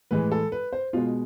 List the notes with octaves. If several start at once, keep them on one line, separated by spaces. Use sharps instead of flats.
A2 E3 G#3 B4
A4
B4
C5
B2 G#3 F4